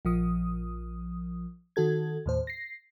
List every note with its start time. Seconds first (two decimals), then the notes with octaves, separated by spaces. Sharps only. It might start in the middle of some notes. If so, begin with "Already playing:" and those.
0.05 A#1 F3 D#6
1.76 D#3 F#4 A4 G#6
2.26 D#2 A2 C5
2.47 A#6 C7